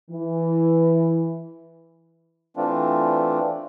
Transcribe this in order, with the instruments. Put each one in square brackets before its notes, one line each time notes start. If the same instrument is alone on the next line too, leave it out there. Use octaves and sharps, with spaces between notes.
[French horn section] E3
[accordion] E3 A3 C4 D4 F4